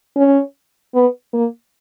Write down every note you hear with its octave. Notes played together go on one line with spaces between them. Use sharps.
C#4
B3
A#3